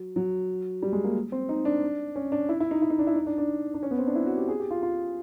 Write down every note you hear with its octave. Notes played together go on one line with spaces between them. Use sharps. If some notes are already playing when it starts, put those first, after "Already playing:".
Already playing: F#3
F#3
G3
G#3
A#3
C4
D#4
D4
C#4
D4
E4
E4
D#4
E4
D#4
D4
E4
D#4
D4
D4
D4
C#4
B3
C4
D4
E4
F#4
G4
G#4
G4
F4
F4